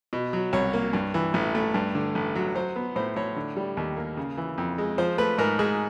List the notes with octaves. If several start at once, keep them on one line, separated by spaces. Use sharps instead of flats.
B2
F#3
C2 C#5
A#3
G2
E3
A1
A3
G2
D3
A1
F#3
F#3 C5
B3
A2 C5
A2 C#5
D3
G3
D#2
A#3
C#3
E3
F2
G#3
F3 C5
A3 B4
G#2 A#4
G#2 G#4